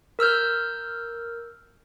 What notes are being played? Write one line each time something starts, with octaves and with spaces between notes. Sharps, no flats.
A#4 E6 F6 G6